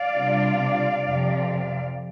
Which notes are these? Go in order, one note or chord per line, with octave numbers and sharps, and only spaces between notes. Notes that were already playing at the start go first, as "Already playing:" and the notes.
Already playing: D5 F5
C3 G3 D4 F4
F2 C3 F3